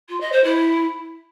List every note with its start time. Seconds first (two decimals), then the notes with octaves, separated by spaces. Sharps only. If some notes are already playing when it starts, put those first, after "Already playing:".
0.09 F4
0.20 D#5
0.32 C5
0.44 E4